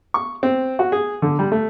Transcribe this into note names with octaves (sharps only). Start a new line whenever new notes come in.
C#6
C4
F#4
G#4
D3
G3
A3